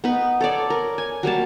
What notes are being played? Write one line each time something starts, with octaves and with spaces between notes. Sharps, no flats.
B3 D#4 B4
A4 C#5 D5
A#4
G#5
F#3 G3 A#3 A5